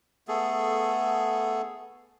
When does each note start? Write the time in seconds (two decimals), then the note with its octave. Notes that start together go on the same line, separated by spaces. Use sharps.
0.28 A3 B3 G#4 A4